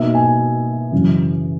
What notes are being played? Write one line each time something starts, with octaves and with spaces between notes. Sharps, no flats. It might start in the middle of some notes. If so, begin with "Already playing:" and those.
Already playing: B2 A#3 D#4 E5
G#5
F#2 C#3 E3